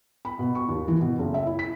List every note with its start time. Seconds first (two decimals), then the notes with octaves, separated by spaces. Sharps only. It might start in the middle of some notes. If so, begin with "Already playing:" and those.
0.25 B5
0.39 B2
0.55 C#6
0.68 D#2
0.88 E3
1.01 B2
1.19 F#1
1.34 E5
1.46 E4
1.59 B6